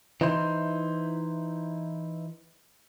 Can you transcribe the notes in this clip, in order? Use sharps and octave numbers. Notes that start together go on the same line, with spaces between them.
E3 D#4 E4 C5